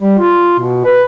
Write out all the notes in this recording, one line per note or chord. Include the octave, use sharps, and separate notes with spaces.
G3
F4
B2
B4